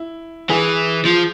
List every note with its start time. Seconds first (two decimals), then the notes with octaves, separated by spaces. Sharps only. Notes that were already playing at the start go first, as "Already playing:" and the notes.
Already playing: E4
0.50 E3 G#4
1.05 F3